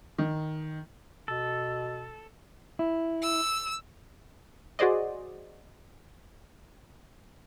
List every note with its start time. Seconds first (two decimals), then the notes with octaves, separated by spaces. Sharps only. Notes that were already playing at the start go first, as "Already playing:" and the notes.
0.18 D#3
1.28 B2 A4
2.79 E4
3.22 E6
4.79 F#4 G#4 C5 D5 D#5